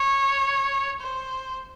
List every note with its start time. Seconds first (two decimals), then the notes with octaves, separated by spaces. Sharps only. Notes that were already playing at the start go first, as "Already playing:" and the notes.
Already playing: C#5
1.01 C5